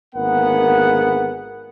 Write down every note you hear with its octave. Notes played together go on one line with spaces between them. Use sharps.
G#1 D3 A#3 B3 G#4 F#5